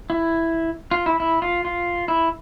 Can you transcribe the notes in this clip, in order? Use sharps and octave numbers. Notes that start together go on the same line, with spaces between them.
E4
F4
E4
E4
F4
F4
E4